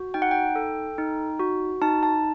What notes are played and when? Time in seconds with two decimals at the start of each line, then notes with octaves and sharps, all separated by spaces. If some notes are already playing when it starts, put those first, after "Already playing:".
Already playing: F#4
0.14 D#4 G5
0.22 F#5
0.31 G5
0.56 A4
0.98 D#4
1.40 F#4
1.82 D#4 A5
2.03 A5